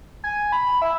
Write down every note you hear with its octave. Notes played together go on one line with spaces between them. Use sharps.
G#5
G#5
B5
E5